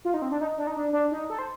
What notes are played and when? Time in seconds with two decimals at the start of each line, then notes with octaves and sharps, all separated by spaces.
0.05 F4
0.14 D#4
0.22 C4
0.31 D4
0.41 D#4
0.58 D4
0.67 D#4
0.76 D4
0.93 D4
1.12 D#4
1.30 A4
1.39 C5